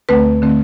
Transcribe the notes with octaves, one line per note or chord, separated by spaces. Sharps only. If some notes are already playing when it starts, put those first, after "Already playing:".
D2 D3 A3 C4 B4
D3 A3 C4